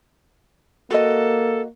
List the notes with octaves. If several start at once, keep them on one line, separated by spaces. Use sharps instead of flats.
A#3 F#4 A4 D#5